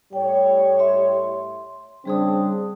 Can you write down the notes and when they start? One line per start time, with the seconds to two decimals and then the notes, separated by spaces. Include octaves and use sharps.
0.13 A2 G3 C#5 G5
0.79 E5 C6
2.05 C#3 G3 C4 D4 G#4 D#6